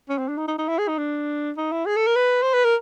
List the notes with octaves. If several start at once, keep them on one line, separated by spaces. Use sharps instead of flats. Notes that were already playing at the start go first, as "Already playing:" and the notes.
C#4
C4
D4
D#4
D#4
D#4
E4
G#4
D#4
D4
D#4
E4
G#4
A4
A#4
B4
C5
B4
A#4